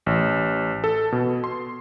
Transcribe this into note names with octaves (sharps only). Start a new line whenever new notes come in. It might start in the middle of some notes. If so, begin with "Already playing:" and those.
A1
A4
B2
C6